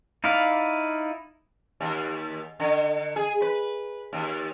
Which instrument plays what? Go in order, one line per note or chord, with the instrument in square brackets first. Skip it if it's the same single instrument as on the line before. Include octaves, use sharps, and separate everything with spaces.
[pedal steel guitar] D#4 E4 D5 F5
[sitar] D#2
D3
G#4
B4
D#2